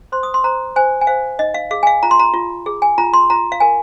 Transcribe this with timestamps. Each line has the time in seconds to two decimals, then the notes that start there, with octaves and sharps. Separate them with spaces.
0.12 C5 C6
0.23 D#6
0.34 C6
0.44 C5 A#5
0.76 C5 G#5
1.01 G#5
1.07 C5 F5
1.39 D#4 D#5
1.54 F5
1.71 G#4 F5
1.83 G#5
1.87 F5
2.03 F4 A#5
2.11 C6
2.19 A#5
2.34 F4
2.66 G#4
2.82 G#5
2.98 F4 A#5
3.13 C6
3.30 F4 A#5
3.52 F5
3.60 A#4 G#5